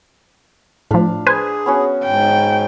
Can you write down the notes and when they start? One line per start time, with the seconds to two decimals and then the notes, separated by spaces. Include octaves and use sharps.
0.91 A2 F3 D4 F5 B5
1.27 G#4 B4 C5 G#5
1.66 B3 C#4 F#4
2.05 G#2 G5